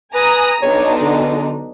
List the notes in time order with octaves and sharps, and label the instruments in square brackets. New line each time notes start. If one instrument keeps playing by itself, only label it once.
[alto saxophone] B4 [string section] G#5 A#5 D#6
[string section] B1 D4 D#4 [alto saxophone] C#5
[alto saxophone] D3